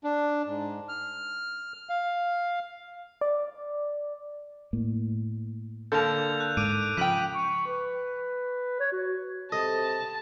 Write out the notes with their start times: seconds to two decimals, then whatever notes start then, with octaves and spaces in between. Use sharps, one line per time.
0.04 D4
0.47 G#2
0.89 F6
1.89 F5
3.21 D5
4.73 A2 A#3
5.92 D3 A#3 A4 A5 G6 F7
6.40 F#6
6.57 G#2 D6 D7 D#7
6.97 C#3 F3 G5 B6 D#7 F#7
7.35 C#6
7.67 B4
8.80 C#5
8.92 F#4
9.52 C3 A4 D#5 A5